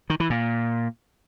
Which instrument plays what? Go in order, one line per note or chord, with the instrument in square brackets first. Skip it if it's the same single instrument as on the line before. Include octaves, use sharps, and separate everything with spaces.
[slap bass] D#3
E3
A#2